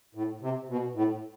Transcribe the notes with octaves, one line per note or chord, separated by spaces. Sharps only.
A2
C3
B2
A2